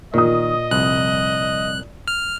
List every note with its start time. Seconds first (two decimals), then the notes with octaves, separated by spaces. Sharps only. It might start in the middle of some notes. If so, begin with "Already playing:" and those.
0.14 A#2 D#3 D#5 D#6
0.71 C2 F2 F#6
2.08 F6